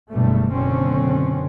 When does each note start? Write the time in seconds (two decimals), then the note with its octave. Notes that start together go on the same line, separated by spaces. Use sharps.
0.10 F#1 B2 D3 G3 A3
0.53 F#1 B2 D3 C4 C#4